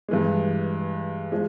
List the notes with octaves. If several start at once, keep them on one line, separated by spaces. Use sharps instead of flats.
G2 E3 G#3
F3 G#3